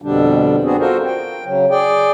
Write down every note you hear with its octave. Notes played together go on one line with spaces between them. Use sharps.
F2 B2 D3 G3 D4
B3 C4 D4 F#4 G#4
F4 F#4 A4 A#4 C5
G5
C#3 F#3
G#4 D5 G5